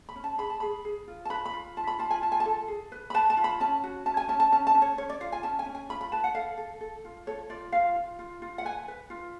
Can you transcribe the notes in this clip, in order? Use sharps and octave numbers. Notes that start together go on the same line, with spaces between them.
B5
C#4
A5
G#4 B5
A5
G#4 B5
G#4
F4
A5
B4 B5
B5
F4
F4 A5
B5
F4 A5
G#5
F4 A5
G#5
A5
A4
G#4
B4
B5
B4 A5
A5
F4
B5
C#4 A5
F#4
C#4 A5
G#5
C#4 A5
A5
C#4 A5
A5
C#4
C#5
C#4 C#5
D5
F4 F5
G#5
C#4 A5
G#5
C#4
G#5
F4 B5
B5
B4 A5
F#5
A4 F5
A4
A4
F4
A4 C#5
F4 D5
F4 F5
F4
F4
F4
F#5
B4 G#5
B4
F4